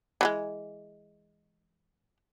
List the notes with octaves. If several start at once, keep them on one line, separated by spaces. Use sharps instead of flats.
E3 F#3 G#3